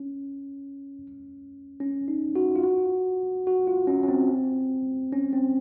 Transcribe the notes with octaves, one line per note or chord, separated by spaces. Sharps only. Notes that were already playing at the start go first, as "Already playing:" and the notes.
Already playing: C#4
C#4
D#4
F#4
F4
F#4
F#4
F4
C#4
C#4
C4
C#4
C4